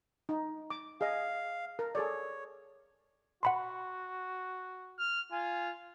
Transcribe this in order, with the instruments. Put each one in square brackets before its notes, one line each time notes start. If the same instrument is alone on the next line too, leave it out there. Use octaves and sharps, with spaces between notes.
[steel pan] D#4
D6
[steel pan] G#4 D#5 [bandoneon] F5
[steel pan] A#4
[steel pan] G#4 A4 D5 [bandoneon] C#5
[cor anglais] F#4 [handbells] F#5 B5 C6
[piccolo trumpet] F6
[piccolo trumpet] F4 [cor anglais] G#5